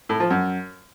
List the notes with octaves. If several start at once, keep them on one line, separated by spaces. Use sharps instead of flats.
A2
F3
F#2